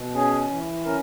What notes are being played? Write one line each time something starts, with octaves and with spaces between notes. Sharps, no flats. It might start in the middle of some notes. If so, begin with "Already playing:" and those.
Already playing: B2
C#4 G#4
E3
C#4 A#4